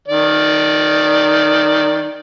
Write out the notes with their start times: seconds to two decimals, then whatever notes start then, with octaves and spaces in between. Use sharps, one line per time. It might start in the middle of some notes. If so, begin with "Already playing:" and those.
0.08 D#3 D5